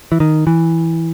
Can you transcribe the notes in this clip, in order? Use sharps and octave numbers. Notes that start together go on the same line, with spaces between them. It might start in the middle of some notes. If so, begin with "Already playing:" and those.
E3
D#3
E3